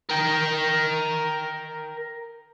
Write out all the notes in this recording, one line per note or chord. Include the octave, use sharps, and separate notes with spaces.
A#4 G5